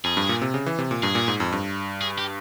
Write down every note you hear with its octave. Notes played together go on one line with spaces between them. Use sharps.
F2 G#4
G2
A#2
C3
C#3
E3
C3
A#2
G2 G#4
A#2
G#2
F2
G2
G#4
G4